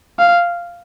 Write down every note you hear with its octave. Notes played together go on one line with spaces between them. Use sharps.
F5